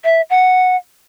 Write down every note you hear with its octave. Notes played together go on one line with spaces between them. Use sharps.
E5
F#5